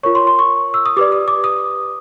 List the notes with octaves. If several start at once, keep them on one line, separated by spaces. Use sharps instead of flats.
F4 A#4 C#5 C#6
C6
C6
C#6
E6
D#6
G4 B4 D5 D6
D#6
D6
D#6